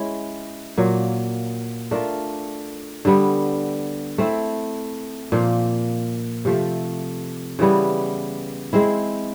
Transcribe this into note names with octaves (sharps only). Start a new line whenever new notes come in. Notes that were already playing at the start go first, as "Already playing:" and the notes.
Already playing: G#3 C#4 E4
A#2 F#3 A#3
A3 D4 F4 A#4
D3 G3 B3
A3 C4 E4
A#2 F3 A#3
C3 F3 A3
C#3 E3 G3 B3
G#3 C4 E4